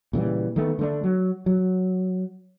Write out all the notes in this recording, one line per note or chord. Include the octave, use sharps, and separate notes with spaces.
A#2 C#3 E3 G3
D#3 A3 B3
D3 A3 D4
F#3
F#3